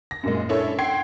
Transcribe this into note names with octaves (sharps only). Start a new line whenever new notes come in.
A#6
F#2 A#2 G#3
C#4 D4 E4 A4 C#5
F#5 G5 C6 G#6 C7